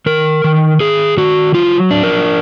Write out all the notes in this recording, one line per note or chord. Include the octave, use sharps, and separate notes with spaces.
D#3 A#4
D#3
D#3 G#4
D#3 F#4
F#3 F4
D4
A#4